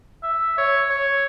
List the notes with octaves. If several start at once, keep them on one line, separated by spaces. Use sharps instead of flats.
E5
C#5
C#5